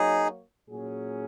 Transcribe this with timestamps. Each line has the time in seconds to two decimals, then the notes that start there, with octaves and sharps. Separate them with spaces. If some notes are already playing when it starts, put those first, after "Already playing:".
Already playing: F#3 A#3 D#4 F#4 G#4 C#5
0.69 A#2 F#3 C#4 G#4